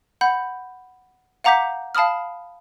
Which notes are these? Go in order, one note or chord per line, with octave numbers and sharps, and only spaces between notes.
F#5 B5 G6
F5 F#5 A#5 D6 G6 B6
F5 A5 B5 D#6 F6